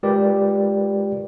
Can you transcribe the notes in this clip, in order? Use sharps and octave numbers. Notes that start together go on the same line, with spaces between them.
G#3 F4 G4 A#4 B4 D5